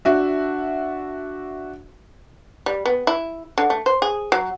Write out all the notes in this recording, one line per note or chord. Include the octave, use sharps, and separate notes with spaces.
D4 F#4 E5
G3
B3
E4
D3
A3
C5
G#4
F#3